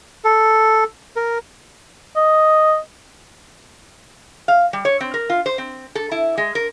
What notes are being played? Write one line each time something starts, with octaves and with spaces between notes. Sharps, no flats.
A4
A#4
D#5
F5
G3
C#5
C4
A#4
F4
C5
C4
A4
E4
G#3
A#4